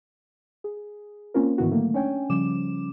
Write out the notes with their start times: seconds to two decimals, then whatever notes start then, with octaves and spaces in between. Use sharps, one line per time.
0.64 G#4
1.34 A#3 C4 C#4 F4 A#4
1.58 G#2 D#3 E3 B3 E4 F#4
1.71 D3 F#3 A3 A#3
1.94 C#4 D4 C#5 G5 G#5
2.29 C#3 F3 G3 C#4 D6 E7